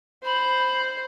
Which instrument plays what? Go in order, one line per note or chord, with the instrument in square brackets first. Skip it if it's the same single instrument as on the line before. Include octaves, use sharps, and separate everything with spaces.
[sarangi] C5 [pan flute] B5